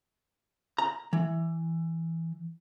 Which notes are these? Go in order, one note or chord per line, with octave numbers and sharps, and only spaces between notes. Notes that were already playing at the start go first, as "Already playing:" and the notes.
A#5
E3